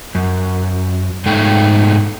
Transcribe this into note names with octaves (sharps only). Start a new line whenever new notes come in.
F#2
G#2 G#3 A3 D#4 A4 G5